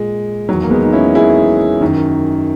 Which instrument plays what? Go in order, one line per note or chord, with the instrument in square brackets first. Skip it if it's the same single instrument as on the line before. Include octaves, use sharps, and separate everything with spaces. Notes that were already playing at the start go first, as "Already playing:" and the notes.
Already playing: [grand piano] A#2 G#3
E2 D#3 F#3
A#3
G#3 B3
D#4
C#4 E4
E4 G#4
F#2 D#3